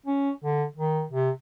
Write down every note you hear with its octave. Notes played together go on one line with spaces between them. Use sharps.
C#4
D3
D#3
C3